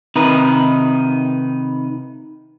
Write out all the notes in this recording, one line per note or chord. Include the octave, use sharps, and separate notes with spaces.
C3 D#3 D#4 B4